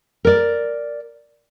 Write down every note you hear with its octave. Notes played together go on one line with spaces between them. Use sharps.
A#4 D5